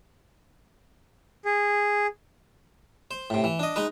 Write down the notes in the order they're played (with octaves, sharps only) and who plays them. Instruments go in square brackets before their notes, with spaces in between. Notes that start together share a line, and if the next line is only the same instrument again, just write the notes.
[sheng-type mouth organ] G#4
[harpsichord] C5
A2 C3
E3
D4 D#5
G#3 D#4 B4